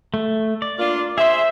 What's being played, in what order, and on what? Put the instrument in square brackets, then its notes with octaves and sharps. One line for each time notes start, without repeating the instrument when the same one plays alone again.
[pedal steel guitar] A3
D5
[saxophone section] A#3 D4 F4
[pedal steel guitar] G#4 C5 [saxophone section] E5